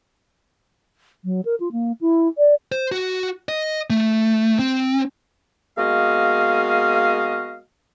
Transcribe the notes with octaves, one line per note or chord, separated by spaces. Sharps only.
F#3
A#4
F4
A#3
E4
D5
C5
F#4
D#5
A3
C4
G#3 A#3 B3 F#4 D#5 F5